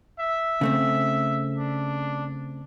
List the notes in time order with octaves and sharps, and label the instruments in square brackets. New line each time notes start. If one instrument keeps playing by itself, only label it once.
[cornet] E5
[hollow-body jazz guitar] C#3 A3 C4
[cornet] D4